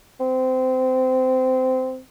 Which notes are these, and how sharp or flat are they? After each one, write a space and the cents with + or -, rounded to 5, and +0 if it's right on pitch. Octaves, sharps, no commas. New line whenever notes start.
C4 -20